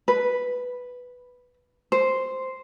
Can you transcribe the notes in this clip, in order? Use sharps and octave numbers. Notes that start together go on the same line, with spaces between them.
B4
C5